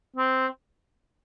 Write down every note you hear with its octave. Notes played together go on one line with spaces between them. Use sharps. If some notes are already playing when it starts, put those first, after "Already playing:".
C4